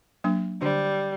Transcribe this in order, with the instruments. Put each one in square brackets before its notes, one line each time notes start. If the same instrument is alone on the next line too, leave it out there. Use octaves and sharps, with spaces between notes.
[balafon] F#3 A#3 D4
[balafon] D3 D4 [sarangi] G3